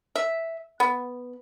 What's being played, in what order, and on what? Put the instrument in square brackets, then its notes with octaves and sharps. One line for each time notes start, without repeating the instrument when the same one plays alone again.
[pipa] E5
B3